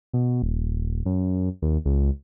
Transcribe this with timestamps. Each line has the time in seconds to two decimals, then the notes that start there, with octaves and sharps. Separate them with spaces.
0.13 B2
0.42 D#1
1.06 F#2
1.62 D#2
1.85 C#2